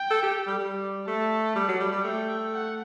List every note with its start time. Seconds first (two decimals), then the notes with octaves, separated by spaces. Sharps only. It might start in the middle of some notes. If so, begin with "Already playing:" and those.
Already playing: G5
0.11 A4
0.23 G4
0.47 G3
0.59 G3
1.07 A3 A5
1.56 G3
1.69 F#3
1.80 G3
1.92 G3
2.04 A3 G5
2.53 F#5